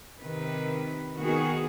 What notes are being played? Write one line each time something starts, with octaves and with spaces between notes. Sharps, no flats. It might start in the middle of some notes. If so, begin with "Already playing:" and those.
C3 D#3 B4
D#3 B3 F#4 G#4